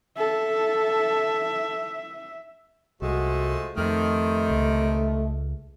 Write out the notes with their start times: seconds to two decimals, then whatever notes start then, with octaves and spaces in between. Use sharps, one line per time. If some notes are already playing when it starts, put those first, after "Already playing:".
0.18 A4 E5
3.02 C2 F3 G#3 A3 F#4
3.77 F2 C3 D#3 A3
4.50 C#2